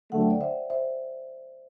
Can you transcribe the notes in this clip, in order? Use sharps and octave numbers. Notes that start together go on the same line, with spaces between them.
D2 D3 F#3 A3 F#5
G5
D5 F#5
C5 E5
C5 E5